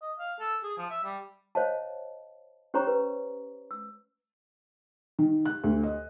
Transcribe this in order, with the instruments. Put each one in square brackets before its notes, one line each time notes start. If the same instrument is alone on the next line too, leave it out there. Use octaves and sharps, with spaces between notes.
[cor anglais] D#5
F5
A4
G#4
F3
E5
G3
[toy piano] C5 C#5 D#5 F5 A5
C#4 G4 C5 C#5 A#5 C#6
B4
E6
[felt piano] D#3
F#6
D2
D#5